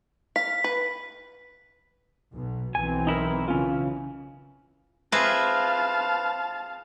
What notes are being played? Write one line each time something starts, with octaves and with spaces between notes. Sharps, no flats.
F5 B6
B4
B1 B2
B1 E3 C4 G#5
D#4 E4 A#4
C#3 E3 C#4 F4
C4 F4 G#4 B4 E5 F5 A5